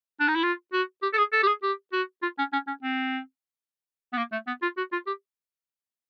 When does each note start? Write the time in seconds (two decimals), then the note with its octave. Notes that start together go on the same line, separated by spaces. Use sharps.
0.20 D4
0.28 D#4
0.35 E4
0.43 F4
0.73 F#4
1.03 G4
1.13 A4
1.18 G#4
1.33 A4
1.43 G4
1.47 G#4
1.63 G4
1.93 F#4
2.22 F4
2.38 C#4
2.53 C#4
2.67 C#4
2.83 C4
4.13 B3
4.18 A#3
4.32 A3
4.47 B3
4.62 F4
4.77 F#4
4.92 F4
5.07 G4